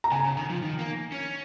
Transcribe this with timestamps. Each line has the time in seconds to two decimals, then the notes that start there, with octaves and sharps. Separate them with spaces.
0.04 A#5
0.12 C#3 G#5
0.25 C#3
0.37 D#3
0.50 F3
0.62 D#3
0.79 A#3
1.12 C#4